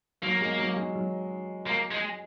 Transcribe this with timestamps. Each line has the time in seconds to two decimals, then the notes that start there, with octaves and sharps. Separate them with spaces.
0.22 F#3 A#3
0.41 G#3
0.59 F#3
0.76 G#3
0.95 F#3
1.67 A#3
1.91 G#3